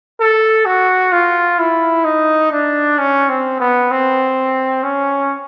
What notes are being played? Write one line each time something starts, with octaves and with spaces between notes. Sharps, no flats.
A4
F#4
F4
E4
D#4
D4
C#4
C4
B3
C4
C#4